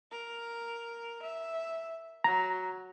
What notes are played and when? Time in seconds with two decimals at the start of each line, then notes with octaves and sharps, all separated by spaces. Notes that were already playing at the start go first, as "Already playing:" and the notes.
0.11 A#4
1.22 E5
2.24 F#3 A#5